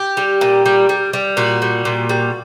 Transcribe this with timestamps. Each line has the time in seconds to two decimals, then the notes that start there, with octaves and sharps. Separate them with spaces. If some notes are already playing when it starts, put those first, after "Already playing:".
Already playing: G4
0.17 G3
0.41 A#2
0.65 G3
0.89 G3
1.13 G3
1.37 A#2 F#4
1.62 G3
1.85 A#2
2.09 G3